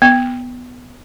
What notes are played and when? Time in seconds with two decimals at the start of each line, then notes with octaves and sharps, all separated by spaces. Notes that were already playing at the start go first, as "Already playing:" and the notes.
0.02 B3